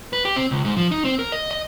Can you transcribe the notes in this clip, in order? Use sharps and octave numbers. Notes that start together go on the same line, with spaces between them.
B4
G4
C4
C#2
G#2
F3
D#4
C4
A#4
D#5
D#5